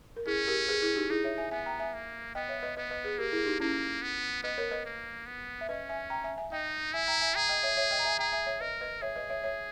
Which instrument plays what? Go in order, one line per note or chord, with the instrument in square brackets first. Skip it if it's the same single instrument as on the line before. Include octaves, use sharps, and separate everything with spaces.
[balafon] A#4
[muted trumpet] C#4 [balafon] E4 G#4
[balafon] G4 A#4
G#4 B4
E4 G#4
D#4 G4
[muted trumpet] D#4 [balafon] E4 G#4
[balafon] C#5 E5
E5 G#5
[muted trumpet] B3 [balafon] E5 G#5
[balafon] G5 A#5
E5 G#5
[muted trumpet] A#3
[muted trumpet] B3 [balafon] D#5 G5
[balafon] C#5 E5
B4 D#5
[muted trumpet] B3 [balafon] B4 D#5
[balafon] B4 D#5
G#4 B4
[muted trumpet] A#3 [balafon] G4 A#4
[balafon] E4 G#4
D#4 G4
[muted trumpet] A#3 [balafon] C#4 E4
[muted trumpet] B3
[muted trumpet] B3 [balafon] B4 D#5
[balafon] A#4 C#5
B4 D#5
[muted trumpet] A#3
B3
[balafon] E5
[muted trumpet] C#4 [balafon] B4 D#5
[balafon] E5 G#5
G5 A#5
E5 G#5
E5 G#5
[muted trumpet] D#4 [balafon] D#5 G5
[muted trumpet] E4 [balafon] E5 G#5
[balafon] G5 A#5
E5 G#5
[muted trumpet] G#4 [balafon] G5 A#5
[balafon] D#5 G5
C#5 E5
C#5 E5
D#5 G5
A#5
E5 G#5
[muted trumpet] G#4 [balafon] G5 A#5
[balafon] E5 G#5
C#5 E5
[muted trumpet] A#4 [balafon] B4 D#5
[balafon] B4 D#5
[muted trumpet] G#4 [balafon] C#5 E5
[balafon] B4 D#5
C#5 E5
C#5 E5